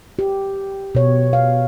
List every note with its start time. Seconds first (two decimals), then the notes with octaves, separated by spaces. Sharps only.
0.19 G4
0.95 B2 C#5
1.33 F5